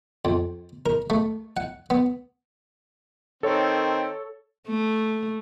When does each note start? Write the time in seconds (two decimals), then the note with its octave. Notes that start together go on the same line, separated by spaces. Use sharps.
0.25 F2
0.86 A#4
1.10 A3
1.57 F#5
1.90 B3
3.43 D#3 C4 A4 C#5
4.68 A3